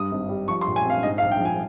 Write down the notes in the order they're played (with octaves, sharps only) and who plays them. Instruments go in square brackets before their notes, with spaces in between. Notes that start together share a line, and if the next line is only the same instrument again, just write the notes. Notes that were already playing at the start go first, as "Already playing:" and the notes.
Already playing: [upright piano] G2 D#6
G#1
G3
F3 C#6
C6
A#2
G#5
C4 F5
G#2 D#5
F5
A#1
G5
F3 G#5